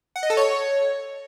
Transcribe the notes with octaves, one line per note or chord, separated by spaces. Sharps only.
F#5
D#5
A4
C#5